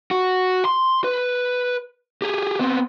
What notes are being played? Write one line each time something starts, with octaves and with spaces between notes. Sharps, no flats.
F#4
C6
B4
G4 G#4
B3 C4